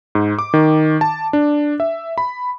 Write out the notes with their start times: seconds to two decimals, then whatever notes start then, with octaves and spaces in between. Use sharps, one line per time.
0.15 G#2
0.39 D6
0.54 D#3
1.01 A5
1.33 D4
1.80 E5
2.18 B5